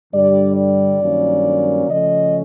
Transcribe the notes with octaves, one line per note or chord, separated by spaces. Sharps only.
G2 D3 G3 D5
D5
G2 D#3 F#3 A#3 C#4
C#3 F3 A3 C#4 D#5